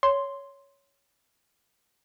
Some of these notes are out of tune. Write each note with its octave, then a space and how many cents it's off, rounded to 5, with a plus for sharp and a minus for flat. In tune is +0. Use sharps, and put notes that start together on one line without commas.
C#5 +10 C6 +0